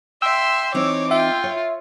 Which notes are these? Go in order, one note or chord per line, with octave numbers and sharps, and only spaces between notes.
E5 G5 C6 E6
E3 C4 D#4 C#5 D6
F4 E5 G5
C#5